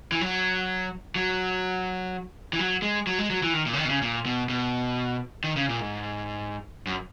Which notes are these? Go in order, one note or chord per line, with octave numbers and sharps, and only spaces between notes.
E3
F#3
F#3
E3
F#3
G#3
F#3
G#3
F#3
E3
D#3
A#2
C#3
D#3
B2
C#3
A#2
B2
B2
D#3
C#3
A#2
G#2
F#2